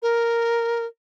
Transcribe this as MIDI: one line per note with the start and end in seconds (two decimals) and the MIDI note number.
0.02 0.85 70